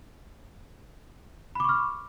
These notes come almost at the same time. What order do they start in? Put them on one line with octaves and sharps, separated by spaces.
B5 D6 C#6 F6